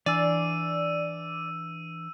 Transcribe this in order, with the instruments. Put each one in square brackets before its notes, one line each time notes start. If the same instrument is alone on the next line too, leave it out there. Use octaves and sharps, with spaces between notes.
[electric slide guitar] E3 D4 G#5 [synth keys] D5 [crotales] E6 D#7